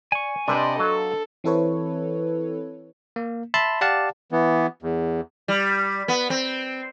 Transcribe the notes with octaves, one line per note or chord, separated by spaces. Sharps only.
D5 G#5 C#6
C3 D4 B4 C5 D5 D#5
F#3 A4 F5 A5
E3 C4 E4 A4 B4 C#5
A#3
E5 A5 B5 C6
G4 D5 F5 F#5 A5
E3 B3
E2
G3
B3
C4